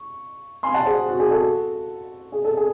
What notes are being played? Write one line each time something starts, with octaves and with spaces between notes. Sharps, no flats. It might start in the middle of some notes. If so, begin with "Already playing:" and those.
Already playing: C#6
G#5 C6
F#5 A5
G#4 C5
F#4
G#4
F#4 A4
G#4
A4
G#4